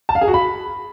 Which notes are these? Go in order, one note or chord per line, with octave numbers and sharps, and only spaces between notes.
A5
F5
G#4
F#4
B5